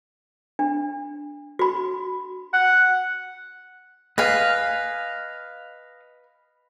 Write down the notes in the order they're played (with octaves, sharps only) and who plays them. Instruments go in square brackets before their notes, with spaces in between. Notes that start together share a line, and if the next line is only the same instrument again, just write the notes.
[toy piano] D4
F#4 B5
[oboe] F#5
[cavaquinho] B4 G#5 [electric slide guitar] D#5 F5